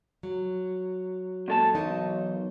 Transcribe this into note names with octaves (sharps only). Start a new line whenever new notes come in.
F#3
A#2 A4 A5
B1 E3 D#4 A#4